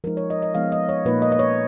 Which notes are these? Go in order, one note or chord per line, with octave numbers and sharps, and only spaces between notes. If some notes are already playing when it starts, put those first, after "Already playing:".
F3 G#3 D#4 A#4
C#5
D#5
D#5
F3 G#3 B3 D#4 F5
D#5
C#5
A#2 F3 A#3 D#4 B4
D#5
D#5
C#5